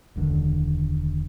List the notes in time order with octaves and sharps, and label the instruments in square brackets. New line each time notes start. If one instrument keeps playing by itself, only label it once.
[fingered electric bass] E1 C#2 D3 D#3